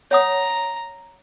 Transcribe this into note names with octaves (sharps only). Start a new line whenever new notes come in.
C#5 F#5 A#5 D#6